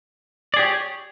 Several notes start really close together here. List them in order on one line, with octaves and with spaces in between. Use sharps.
D5 G#4 G4 C#5